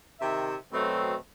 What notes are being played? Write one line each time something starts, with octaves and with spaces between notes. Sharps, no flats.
C3 D#3 E5
B2 F#3 A3 C4